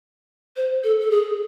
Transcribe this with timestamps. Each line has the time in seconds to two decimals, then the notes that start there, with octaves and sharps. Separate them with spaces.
0.56 C5
0.84 A4
1.01 A4
1.11 G#4